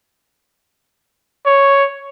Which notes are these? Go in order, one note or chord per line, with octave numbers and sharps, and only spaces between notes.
C#5